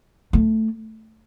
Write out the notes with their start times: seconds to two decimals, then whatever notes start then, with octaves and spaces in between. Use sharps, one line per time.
0.33 A3